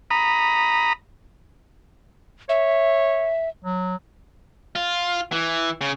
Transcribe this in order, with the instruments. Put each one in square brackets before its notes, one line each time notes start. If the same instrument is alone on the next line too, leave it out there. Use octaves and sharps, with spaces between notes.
[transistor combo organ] A#5 B5 D#6
[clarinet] C#5 [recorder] E5
[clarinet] F#3
[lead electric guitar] F4
E3
C#3